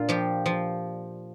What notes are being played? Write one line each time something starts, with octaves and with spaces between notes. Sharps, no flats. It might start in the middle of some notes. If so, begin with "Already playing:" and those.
Already playing: A#2 D4 F4
F3 G4
F3